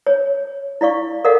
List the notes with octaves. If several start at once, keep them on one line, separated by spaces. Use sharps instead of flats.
C#5
E4 D5 F5 C#6
A4 A#4 D5 D#5 F5 F#5